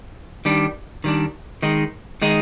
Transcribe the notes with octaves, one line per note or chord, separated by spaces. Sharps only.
D#3 G3 D4
D#3 G3 D4
D#3 G#3 D#4
D#3 G#3 D#4